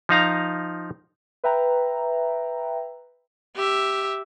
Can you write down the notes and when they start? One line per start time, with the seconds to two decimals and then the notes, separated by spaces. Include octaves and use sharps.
0.09 F3 D#4 F5 A#5
1.44 B4 E5 G5 A#5
3.56 G4 E5